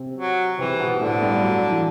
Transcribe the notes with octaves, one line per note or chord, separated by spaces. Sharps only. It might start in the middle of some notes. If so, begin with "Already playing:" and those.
Already playing: C3 C4
F#3
C3 E3 C4
B2 B3
A2 D3 A3
G2 G3
F#3
E3